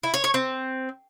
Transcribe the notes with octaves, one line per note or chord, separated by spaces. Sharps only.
E4
C#5
C#5
C4